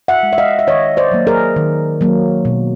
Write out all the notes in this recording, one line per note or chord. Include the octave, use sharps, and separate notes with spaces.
E5 F#5
G#3
E5
D#5 F5
E5
D#3 C#5 D#5
C5 D5
F#3 A#3
G#4 A#4
D#3
F#3 A#3
B2